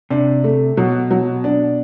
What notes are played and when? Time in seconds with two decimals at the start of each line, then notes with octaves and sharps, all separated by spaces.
0.10 C3 D4
0.44 A3
0.77 B2 F#3
1.11 F#3
1.44 D4